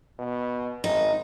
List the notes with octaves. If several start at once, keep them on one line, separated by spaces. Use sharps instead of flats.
B2
G#1 D#4